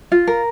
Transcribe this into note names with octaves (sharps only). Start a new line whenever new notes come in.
F4
A#4